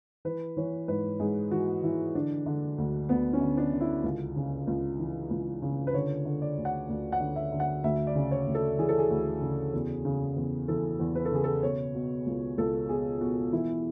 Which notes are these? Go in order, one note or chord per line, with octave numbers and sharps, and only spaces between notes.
E3 B4
E3 C#5
G#2 B4
G#2 G#4
E3 F#4
E3 E4
D3 D4
D3
D2
D2 B3
C#4
D3
D4
D3
E4
C#2
C#3
C#2
E3
C#2
C#3
B4
D3 C#5
D3
D5
D2
F#5
D2
F#5
D3
E5
D3
F#5
D2 E5
D5
C#3
C#5
D2
A4
E3 G#4
A4
G#4
D2
C#3
E2
C#3
E2
E3 A4
E2
B4
A4
C#3 G#4
A4
B2 C#5
B2
C#2
C#2 A4
B2 G#4
B2 F#4
E3 E4